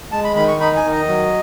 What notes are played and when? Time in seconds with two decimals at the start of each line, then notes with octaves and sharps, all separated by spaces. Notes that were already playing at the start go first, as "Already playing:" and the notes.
0.12 G#3 A5
0.24 B5
0.35 D#3 B5
0.48 C#6
0.60 D#4 B5
0.76 G#5
0.84 D#3
0.92 D#5
1.08 F#3